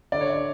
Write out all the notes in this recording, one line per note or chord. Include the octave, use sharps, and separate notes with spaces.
D3 D5
C#5
D5